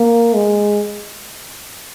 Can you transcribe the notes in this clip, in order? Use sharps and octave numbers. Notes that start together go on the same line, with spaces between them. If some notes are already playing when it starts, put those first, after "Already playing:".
Already playing: A#3
G#3